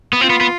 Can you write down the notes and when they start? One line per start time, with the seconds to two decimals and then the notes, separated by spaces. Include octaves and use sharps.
0.13 B3
0.20 C4 F4
0.30 B3
0.41 B3